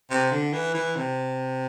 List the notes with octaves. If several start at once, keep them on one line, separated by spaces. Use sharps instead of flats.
C3
D3
E3
E3
C3